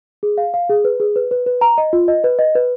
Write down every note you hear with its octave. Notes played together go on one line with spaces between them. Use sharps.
G#4
F5
F5
G#4
B4
G#4
B4
B4
B4
A#5
D#5
F4
D#5
B4
D#5
B4